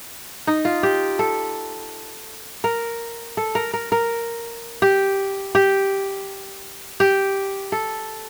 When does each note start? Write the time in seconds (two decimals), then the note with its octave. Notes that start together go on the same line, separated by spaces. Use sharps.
0.47 D#4
0.65 F4
0.83 G4
1.19 A4
2.64 A#4
3.37 A4
3.55 A#4
3.73 A#4
3.92 A#4
4.82 G4
5.55 G4
7.00 G4
7.72 A4